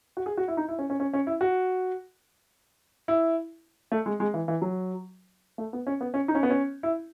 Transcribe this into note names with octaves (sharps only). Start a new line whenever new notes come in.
F#4
G#4
F#4
E4
D#4
E4
C#4
C#4
C#4
C#4
E4
F#4
E4
A3
G#3
G#3
E3
E3
F#3
A3
B3
C#4
B3
C#4
D#4
C#4
B3
C#4
E4